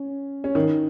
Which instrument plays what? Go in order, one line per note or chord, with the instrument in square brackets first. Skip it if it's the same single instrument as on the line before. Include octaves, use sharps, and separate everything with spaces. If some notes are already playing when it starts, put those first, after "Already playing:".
Already playing: [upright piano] C#4
C#4
D#3 D#4